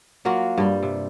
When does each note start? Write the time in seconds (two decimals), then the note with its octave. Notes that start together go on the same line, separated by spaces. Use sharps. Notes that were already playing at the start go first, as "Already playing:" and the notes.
0.25 F#3 A#3 F4 F#4
0.58 G2 G3
0.83 C3